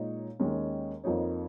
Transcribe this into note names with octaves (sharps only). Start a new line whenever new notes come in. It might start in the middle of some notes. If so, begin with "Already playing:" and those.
Already playing: A#2 G#3 D#4 C#5
D#2 D#3 G#3 C#4 A#4
F2 F3 A#3 D#4 C#5